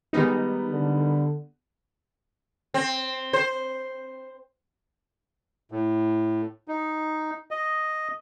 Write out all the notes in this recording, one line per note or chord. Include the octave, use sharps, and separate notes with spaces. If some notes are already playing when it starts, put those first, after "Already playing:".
D#3 G3 G#3 B3 D#4
D3
C4
C5
A2
D#4
D#5